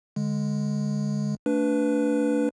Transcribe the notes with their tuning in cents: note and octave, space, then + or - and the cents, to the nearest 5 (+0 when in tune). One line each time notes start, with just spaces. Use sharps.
D3 +0 G#3 +0
A3 +20 D4 -20 B4 +0